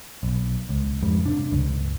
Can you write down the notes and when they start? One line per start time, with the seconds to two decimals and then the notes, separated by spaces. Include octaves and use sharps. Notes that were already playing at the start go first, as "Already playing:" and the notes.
0.23 B1
0.69 C#2
1.03 F2 G#2 G3
1.26 C3 D4
1.52 C#2 G2